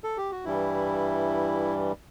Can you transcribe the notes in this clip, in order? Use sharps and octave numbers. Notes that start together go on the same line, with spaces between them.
A4
G4
F#4
G2 E3 G3 E4